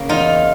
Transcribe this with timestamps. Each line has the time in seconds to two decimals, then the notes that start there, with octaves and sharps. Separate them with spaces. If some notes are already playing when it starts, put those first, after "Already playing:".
Already playing: C#3 A#3
0.09 E2 D#4 F4